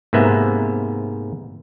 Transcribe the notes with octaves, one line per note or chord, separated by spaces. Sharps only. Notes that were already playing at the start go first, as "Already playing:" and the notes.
G#2 C3 A#3 B3 E5